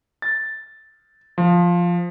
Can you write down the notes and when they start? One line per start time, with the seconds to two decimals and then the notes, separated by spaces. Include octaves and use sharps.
0.22 A6
1.38 F3